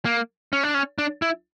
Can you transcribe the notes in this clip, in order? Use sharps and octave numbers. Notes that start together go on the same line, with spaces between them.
A#3
C#4
D4
C#4
D4
E4